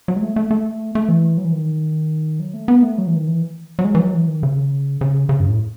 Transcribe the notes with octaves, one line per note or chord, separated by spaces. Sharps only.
F#3
G#3
A3
A3
A3
A3
E3
F#3
E3
D#3
F#3
A3
B3
A3
F#3
E3
D#3
E3
F#3
G#3
E3
F#3
E3
D#3
C#3
C#3
C#3
F#2
A2